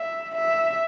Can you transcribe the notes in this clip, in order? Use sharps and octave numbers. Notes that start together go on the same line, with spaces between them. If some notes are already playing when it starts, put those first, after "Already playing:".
Already playing: E5
E5